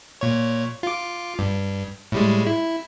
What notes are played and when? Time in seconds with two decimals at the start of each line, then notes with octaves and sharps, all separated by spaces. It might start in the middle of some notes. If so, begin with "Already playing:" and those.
0.21 A#2 C#5
0.83 F4 D6
1.39 G2
2.12 A2 G3 G#3
2.47 E4